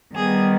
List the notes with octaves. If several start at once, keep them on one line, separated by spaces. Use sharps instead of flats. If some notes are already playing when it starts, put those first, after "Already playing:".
D#3 G3 B3 G#4